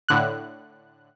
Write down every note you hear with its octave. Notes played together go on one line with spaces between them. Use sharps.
A2 D3 F#6